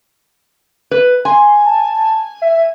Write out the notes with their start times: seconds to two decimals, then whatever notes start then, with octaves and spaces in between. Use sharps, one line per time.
0.91 B4
1.25 G#5 C6
1.66 A5
2.42 E5